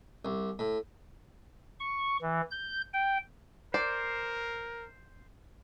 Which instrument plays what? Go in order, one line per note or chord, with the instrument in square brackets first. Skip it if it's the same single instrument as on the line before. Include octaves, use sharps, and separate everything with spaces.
[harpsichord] C2
A2
[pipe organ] C#6
E3
G6
G5
[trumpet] A#4 [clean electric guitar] C5 [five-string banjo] D5